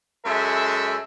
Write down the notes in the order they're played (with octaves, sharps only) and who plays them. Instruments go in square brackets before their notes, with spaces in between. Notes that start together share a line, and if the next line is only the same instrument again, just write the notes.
[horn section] F#2 G#3 A4 E5